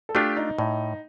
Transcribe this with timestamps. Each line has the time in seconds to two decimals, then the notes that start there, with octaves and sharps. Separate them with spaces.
0.09 A4
0.15 A3 D4 F4 G4
0.37 D#4
0.58 A2 D#4